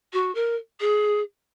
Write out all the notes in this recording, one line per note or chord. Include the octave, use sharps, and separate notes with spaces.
F#4
A#4
G#4